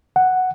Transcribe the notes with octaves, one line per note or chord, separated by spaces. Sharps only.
F#5